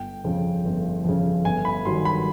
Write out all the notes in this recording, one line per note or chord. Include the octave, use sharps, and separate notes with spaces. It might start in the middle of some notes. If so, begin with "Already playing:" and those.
Already playing: G1 G5
F2 C#3
G1
F2 C#3
G1 G#5
B5
G2 D#3 F#3 C6
B5